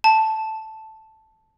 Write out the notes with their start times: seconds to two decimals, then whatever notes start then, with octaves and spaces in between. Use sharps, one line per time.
0.04 A5